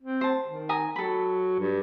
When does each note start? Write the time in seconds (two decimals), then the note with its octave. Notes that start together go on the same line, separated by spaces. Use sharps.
0.01 C4
0.21 C5 A5
0.47 D#3
0.69 G#5 A#5 D#6
0.96 F#3 A4 B5
1.59 G2